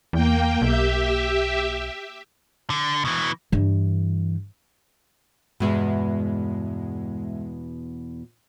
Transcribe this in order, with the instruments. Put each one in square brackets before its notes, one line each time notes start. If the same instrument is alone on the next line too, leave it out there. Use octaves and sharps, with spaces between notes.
[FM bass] E2 [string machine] A#3 G5
[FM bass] B1 [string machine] G4 E5
[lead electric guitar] D3
B2 E3
[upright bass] G2 E3
[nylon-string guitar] E2 B2 [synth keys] G2 G#3 E5